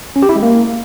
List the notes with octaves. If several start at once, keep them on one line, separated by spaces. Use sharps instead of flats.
C#4
G4
E4
G#3
A#3